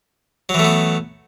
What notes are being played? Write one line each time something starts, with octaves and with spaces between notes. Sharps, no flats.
E3 F#3 A3 B3